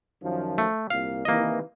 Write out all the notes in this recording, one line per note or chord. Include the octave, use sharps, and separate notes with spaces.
F#2 D#3 F3
A3
C2 A#2 F5
C3 D#3 E3 A#3 D#5